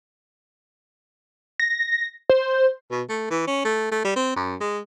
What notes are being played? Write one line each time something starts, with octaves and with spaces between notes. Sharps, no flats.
A#6
C5
B2
A3
E3
C#4
A3
A3
G3
C4
F#2
G#3